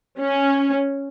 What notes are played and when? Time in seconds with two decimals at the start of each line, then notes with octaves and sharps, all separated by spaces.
0.19 C#4